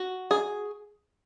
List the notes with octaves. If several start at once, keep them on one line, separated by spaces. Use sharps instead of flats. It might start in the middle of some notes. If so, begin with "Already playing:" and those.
Already playing: F#4
G#4